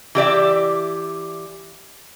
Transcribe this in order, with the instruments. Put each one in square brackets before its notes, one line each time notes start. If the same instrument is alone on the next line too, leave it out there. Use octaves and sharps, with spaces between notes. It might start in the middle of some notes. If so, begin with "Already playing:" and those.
[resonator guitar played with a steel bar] E3 G4 D5 E5